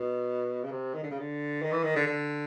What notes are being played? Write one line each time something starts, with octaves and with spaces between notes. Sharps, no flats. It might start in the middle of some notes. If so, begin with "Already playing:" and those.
Already playing: B2
C#3
C3
D#3
D3
C#3
D3
D#3
E3
D#3
D3
D3